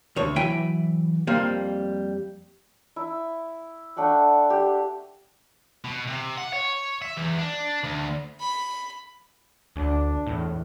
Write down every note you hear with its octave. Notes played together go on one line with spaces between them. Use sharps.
D2 C#5
E3 F#3 E4 G5 G#5
F2 G3 A#3 C5
E4
A3 D4 F#5 G5
G4
B2
C3
F#5
C#5
E5
E2
D4
D2
B5
D2 D4
E2 A2